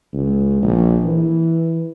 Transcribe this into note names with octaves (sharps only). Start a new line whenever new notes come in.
C#2
A#1
E3